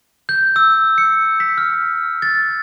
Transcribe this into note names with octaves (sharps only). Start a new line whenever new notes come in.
G6
E6
C#7
B6
F6
A6